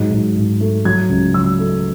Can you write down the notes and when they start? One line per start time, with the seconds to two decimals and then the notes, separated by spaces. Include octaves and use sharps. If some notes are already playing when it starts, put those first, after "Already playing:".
Already playing: G#2 F#3
0.11 G#2
0.36 G#2
0.61 A3
0.85 F#3 G#6
1.09 C#2
1.34 F#3 E6
1.59 A3